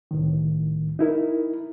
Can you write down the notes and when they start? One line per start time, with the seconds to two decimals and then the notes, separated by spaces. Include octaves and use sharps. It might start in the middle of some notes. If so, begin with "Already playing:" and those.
0.11 C2 A2 D#3
0.99 D#4 E4 A#4